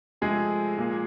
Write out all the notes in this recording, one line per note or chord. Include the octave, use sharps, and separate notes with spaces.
C3 F3 G#3 A3 G#4
A#2 F3 A#3